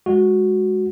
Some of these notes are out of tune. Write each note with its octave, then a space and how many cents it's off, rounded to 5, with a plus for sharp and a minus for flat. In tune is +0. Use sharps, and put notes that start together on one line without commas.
G#3 +0 F#4 +0